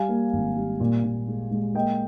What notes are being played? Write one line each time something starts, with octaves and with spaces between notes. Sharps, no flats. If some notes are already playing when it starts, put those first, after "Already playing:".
Already playing: G3 F5 G#5
A#3
G#1
G3
A#2
A#2
G#3
G#3
A#3 D#5 G5